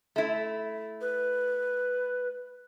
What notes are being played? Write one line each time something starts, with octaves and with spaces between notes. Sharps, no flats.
A3 E4
B4